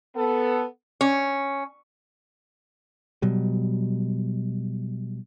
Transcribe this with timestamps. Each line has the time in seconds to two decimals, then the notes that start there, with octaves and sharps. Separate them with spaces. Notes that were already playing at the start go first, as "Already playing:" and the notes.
0.16 B3 A4
1.01 C#4
3.22 B2 F#3 G3